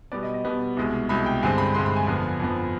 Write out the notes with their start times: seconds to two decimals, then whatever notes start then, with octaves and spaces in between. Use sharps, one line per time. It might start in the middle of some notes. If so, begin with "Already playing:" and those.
0.12 B2 G3 B3 D5
0.23 D#5
0.34 D#5
0.45 B2 G3 B3
0.77 C2 B2 G#3
1.09 C2 B2 G#3 B5
1.26 G5
1.43 G2 D3 G#3 C4 G#5
1.58 B5
1.75 G2 D3 G#3 C4 C6
1.86 B5
1.96 G#5
2.07 F2 D3 F3 B3
2.40 F2 D3 F3 B3